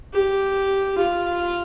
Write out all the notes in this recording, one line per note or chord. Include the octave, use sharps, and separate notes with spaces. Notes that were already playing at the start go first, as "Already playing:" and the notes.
G4
F4